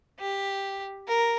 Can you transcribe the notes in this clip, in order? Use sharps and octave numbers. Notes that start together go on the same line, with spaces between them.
G4
A#4